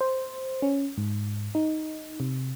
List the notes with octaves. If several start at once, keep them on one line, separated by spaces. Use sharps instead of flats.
C5
C#4
G#2
D#4
C3